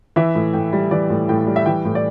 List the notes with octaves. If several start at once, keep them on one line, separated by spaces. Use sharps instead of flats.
E3 E5
A2
A2 G5
G3
E3 D5
A2
A2 G5
G3
E5
E3 G5
A2
D5